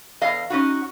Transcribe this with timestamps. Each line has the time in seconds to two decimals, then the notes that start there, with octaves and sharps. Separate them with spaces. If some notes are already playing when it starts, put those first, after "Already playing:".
0.21 E2 D#5 F5
0.50 C#4 D#4 F#4